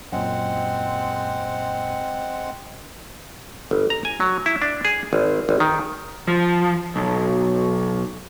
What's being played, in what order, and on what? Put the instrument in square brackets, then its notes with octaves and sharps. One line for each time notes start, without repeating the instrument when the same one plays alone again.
[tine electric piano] F#2 A#2 [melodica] G#3 C4 F#5
[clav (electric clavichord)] G1
A#5
G#5
F#3
E4
D4
G#4
G#1
G#1
D#3
[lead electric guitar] F3
B1